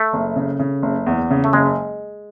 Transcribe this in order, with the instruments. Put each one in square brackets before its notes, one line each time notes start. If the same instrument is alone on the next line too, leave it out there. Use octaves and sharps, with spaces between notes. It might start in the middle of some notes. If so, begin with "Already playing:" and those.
Already playing: [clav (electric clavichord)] A3
[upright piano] F#1
C#3
C#3
F#1
E2
C#3
[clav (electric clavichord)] A3
[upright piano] F#1 [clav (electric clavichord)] G#3